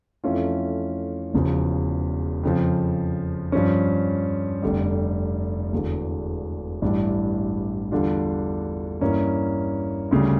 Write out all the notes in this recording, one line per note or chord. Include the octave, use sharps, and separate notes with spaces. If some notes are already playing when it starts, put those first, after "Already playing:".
F2 E3 A3 C#4 F4
E1 E2 C#3 F3
F2 C#3 F3
G2 F3 C#4
F1 F2 D3 G3
E1 E2 D3
A1 G2 E3 G3 D4
E2 D3 G3 D4 F4
G2 E3 A#3 C#4
D2 C#3 G3